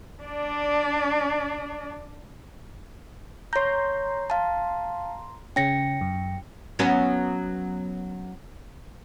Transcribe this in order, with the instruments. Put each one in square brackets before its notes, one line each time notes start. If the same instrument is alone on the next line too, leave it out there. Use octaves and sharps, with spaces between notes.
[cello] D4 D5
[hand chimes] C#5 G6 [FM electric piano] A#5 C6
[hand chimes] F5 A5
[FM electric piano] C#3 C#4 [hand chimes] G5 A#6 C#7
[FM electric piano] F#2
[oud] F#3 B3 C#4